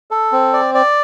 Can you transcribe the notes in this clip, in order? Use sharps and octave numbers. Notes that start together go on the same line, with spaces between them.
A4
C4
D5
D5